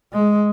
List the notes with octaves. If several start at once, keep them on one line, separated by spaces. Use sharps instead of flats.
G#3